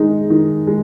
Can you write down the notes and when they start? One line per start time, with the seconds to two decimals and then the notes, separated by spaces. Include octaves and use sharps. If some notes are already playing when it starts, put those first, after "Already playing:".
Already playing: D#3 G#3 D#4
0.30 D#3
0.67 G#3